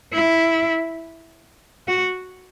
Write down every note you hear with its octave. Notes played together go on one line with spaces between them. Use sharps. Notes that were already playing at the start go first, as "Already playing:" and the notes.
E4
F#4